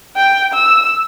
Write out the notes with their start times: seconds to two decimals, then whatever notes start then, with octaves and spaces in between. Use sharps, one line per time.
0.16 G5
0.54 E6